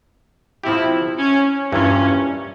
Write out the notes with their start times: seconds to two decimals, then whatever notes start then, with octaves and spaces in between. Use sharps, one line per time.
0.64 F3 C4 E4 G4
1.18 C#4
1.72 G2 E3 A#3 C#4 F4